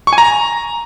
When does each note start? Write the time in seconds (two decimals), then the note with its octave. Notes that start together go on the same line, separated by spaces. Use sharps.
0.07 C#6
0.13 G#5
0.18 A#5